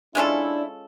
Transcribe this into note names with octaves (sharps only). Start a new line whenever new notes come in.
G#3 C#4 D4 E4 F4 A4